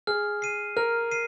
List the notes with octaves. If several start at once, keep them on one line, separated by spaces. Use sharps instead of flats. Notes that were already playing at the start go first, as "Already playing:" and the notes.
G#4 F6
C7 D#7
A#4 F6
C7 D#7